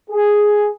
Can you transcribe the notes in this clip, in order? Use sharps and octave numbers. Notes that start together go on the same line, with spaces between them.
G#4